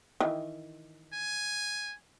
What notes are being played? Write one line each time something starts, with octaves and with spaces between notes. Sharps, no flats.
D#3 E3
G#5